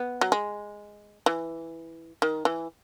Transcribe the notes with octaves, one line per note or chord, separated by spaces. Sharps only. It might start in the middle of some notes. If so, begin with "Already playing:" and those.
Already playing: B3
F#3
G#3
E3
D#3
E3